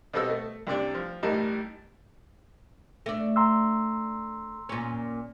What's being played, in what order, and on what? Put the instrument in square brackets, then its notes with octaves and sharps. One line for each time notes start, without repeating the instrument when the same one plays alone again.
[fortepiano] B2 G3 C4 A4 D#5 E6
A3
C2 C3 D4 D5
F3
A1 A2 G3 D#4 A#4 A5
[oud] A3 D4
[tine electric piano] A#5 C6 E6
[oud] A#2 C#4